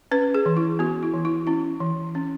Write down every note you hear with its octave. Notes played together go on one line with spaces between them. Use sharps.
C#4 B4
G#4
E3
E4
B3 F#4
E4
E3
E4
C#4 E4
E3
C#4